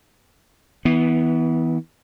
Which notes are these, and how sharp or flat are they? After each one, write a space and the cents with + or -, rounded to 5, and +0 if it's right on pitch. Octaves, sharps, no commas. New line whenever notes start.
E3 -25 B3 +5